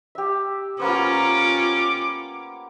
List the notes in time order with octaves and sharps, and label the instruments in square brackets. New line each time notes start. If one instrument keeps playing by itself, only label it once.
[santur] G4 E5
[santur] A#3 B3 C5 [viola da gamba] C#4 F4 [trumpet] D6